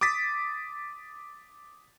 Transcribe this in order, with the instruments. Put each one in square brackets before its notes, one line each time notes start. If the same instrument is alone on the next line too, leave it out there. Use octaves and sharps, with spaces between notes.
[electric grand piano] D6 D#6 A6 B6